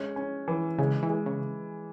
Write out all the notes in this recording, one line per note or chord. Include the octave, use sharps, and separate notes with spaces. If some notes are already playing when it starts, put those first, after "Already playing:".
Already playing: G#3 C#4
C#4
E3
C#3 G#3
E3
G#3
C#3